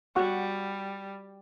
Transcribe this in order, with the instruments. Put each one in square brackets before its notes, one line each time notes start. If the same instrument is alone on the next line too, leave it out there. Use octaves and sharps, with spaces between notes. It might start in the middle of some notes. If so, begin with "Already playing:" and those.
[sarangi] G3 [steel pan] F#4 F#5 C#6